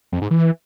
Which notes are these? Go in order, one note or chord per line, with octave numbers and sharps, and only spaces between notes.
F2
G#2
E3